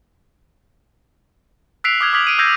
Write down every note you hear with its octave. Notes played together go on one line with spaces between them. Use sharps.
E6 F#6 B6 C7 D7 F7
D6 D#6 F6 F#6 G#6
D6 D#6 F6 G#6 B6 F#7
D7 D#7
E6 G6 G#6 A#6 C7